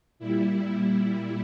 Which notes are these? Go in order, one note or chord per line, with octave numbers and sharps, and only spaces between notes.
A#2 G3 E4